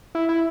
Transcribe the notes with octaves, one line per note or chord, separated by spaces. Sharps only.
E4
E4